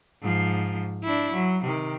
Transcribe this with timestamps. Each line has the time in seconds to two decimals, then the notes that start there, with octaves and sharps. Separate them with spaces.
0.22 G#2 F3
1.04 D4 E4
1.33 F#3
1.64 C3 D#3